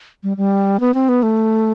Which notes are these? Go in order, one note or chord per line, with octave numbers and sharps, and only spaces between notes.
G3
G3
B3
C4
B3
A3